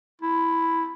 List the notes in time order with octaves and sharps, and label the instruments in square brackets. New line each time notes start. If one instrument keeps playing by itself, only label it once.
[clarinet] E4